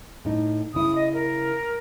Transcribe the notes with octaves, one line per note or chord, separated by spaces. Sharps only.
A2 D#4
C#3 E4 D#6
D#5
A#4